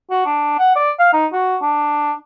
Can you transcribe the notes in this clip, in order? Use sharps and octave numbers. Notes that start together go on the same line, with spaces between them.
F#4
D4
F#5
D5
F5
D#4
F#4
D4